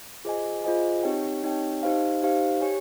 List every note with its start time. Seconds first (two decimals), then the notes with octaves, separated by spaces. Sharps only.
0.25 F4 G#4 C5 D#5 G#5
0.64 F4 G#4 C5 D#5 G#5
1.03 C4 D#4 G4 C#5 G5
1.43 C4 D#4 G4 C#5 G5
1.83 D#4 G4 C5 F5
2.23 D#4 G4 C5 F5
2.61 G4 C#5 G#5